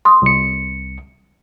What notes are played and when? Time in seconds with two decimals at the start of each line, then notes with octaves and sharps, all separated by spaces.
0.05 C6 D#6
0.22 C2 C#7